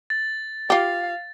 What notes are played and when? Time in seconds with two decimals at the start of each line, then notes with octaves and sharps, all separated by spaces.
0.10 A6
0.70 F4 G4 F5